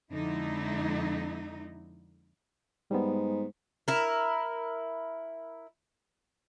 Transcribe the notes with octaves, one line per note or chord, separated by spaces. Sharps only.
F2 D3 G#3 D#4 E4
G#2 G3 B3
E4 A#4